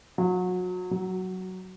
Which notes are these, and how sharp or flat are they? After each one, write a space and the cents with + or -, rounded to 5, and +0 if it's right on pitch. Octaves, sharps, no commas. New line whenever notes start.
F#3 -25
F#3 +10